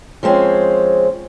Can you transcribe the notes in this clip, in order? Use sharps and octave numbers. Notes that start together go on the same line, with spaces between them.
F3 G#3 C4 C#4